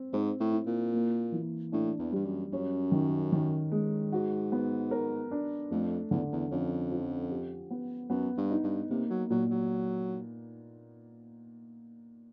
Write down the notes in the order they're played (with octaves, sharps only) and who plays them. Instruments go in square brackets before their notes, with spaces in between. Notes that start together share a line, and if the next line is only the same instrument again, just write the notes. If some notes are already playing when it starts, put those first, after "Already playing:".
Already playing: [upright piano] C4
[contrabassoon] G#2 [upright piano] C4
[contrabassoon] A2
[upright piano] E4
[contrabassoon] A#2
[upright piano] A#3
E3
[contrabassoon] A2 [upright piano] D4
[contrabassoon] E2
[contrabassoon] G2 [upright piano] G3
[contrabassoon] F#2
[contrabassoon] F#2 [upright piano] C#4
[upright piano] D#3
D#3
G#3
[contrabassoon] G#2 [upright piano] F#4
[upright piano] B3
A#4
D4
[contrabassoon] F2 [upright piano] A3
[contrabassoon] E2 [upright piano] D3
[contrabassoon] E2
[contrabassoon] F2 [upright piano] C#4
[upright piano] F3
G4
B3
[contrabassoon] F#2 [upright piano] B3
[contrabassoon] G2
[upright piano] D#4
[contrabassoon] G2
[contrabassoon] C3 [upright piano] A#3
[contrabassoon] F#3
[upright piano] A#2 [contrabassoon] F#3
[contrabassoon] F#3